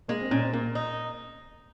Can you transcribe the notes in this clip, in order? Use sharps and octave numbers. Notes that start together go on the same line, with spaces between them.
G#3 A#3
C4
A#2 C#4
C4
A#2 A#3
D#4